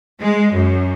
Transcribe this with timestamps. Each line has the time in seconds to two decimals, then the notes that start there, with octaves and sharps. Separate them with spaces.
0.21 G#3
0.53 F#2